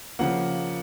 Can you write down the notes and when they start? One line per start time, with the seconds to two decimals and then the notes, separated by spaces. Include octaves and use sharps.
0.19 C#3 F3 A#3 F#5